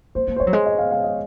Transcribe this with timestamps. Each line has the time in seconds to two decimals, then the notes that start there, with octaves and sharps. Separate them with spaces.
0.15 A#3 C5
0.28 A#3
0.36 C5
0.40 A#3 C#5
0.47 F#3
0.53 G#3
0.66 D#5
0.78 F5
0.91 F5
1.04 D#5